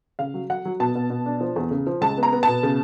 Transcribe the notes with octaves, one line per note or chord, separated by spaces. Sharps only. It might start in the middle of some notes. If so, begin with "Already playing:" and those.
C#3 F5
F#3
F#3 F#5
F#3
B2 A5
B2
B2
D4
F3
E2
C#3
F3
C#2 A5
B3
A#5
B3
B2 A5
C#3